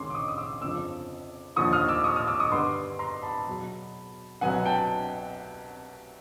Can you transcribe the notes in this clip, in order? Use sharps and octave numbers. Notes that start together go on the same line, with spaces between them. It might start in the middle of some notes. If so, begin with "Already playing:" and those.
Already playing: C#2 C3 D#3 G#3 C#4 C6 D6
D6
C#6 D#6
D#6
D6 E6
G1 F2 C#3 F3 D6 E6
D#2 D3 F3 C#6 D#6
D#6 F6
D6 E6
C#6 D#6
D#6 F6
D6 E6
C#6 D#6
G2 D3 G3 B3 C6 D6
A#5 C6
A5 B5
E2 B2 F#3
C2 B2 F#3 B3 F#5 G#5
G5 A5